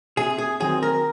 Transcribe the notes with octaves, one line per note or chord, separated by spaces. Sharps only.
C3 G#4
G#4
D#3 F#3 C4 G#4
A#4